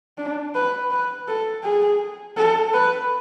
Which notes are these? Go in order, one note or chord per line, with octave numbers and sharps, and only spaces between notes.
D4
B4
B4
A4
G#4
A4
B4